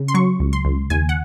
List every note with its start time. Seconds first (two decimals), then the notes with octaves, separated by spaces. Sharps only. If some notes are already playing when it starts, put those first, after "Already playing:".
Already playing: C#3
0.08 C6
0.14 F#3 C#6
0.40 C#2
0.53 C6
0.65 C#2
0.90 D#2 G#5
1.09 F#5